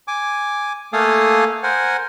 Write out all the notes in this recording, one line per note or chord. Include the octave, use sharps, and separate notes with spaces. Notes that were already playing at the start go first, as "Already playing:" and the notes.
G#5 D6
A3 A#3 A4 F5 G#5 D#6
A#4 C5 F#5 G#5